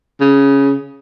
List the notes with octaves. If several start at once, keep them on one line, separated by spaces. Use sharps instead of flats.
C#3